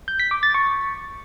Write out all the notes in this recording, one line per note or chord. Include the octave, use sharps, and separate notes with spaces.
G6
B6
D6
A6
C#6